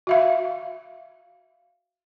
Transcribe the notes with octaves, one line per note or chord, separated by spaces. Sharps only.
F#4 E5 F5